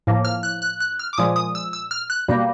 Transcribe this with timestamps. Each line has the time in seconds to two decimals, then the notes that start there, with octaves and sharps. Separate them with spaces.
0.07 A2 F3 A#3
0.25 F6
0.43 F#6
0.62 F#6
0.80 F#6
0.99 F6
1.13 D6
1.18 A#2 F3 G#3 D#6
1.36 D#6
1.55 E6
1.73 E6
1.91 F6
2.10 F#6
2.28 B2 G3 A#3